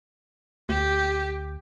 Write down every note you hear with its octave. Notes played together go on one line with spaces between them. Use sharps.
D2 G4